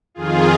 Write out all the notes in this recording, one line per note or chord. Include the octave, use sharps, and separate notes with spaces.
F2 D#3 F4 G#4